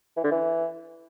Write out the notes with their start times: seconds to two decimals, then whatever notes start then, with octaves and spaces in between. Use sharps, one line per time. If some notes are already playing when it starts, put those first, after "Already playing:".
0.17 E3
0.24 D3
0.31 E3